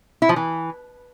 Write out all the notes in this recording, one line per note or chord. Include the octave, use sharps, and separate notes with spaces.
E4
F3
E3